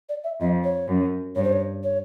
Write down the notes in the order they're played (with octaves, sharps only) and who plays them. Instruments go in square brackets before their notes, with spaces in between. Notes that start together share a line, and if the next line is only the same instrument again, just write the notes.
[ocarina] D5
E5
[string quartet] F2 [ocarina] D#5
[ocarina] C#5
[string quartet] F#2
[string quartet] G2 [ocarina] C#5
[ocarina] C5
C#5
C#5